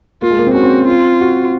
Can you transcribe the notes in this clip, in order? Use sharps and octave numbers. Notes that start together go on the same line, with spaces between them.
A#3 F4
G#3
A#3
C4
C#4 F#4
C4
F4
F#4